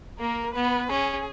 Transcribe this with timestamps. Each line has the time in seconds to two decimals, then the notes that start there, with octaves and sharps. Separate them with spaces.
0.19 A#3 A#4
0.54 B3 B4
0.89 C#4 G#4